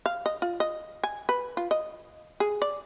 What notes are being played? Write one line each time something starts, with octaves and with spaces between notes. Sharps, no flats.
F5
D#5
F4
D#5
G#5
B4
F4
D#5
G#4
D5